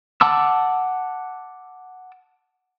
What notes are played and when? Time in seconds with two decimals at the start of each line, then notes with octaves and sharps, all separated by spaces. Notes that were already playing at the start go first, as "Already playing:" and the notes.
0.21 F#5 A5 D6 E6